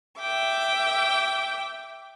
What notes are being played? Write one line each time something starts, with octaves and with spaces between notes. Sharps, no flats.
E5 G5 D6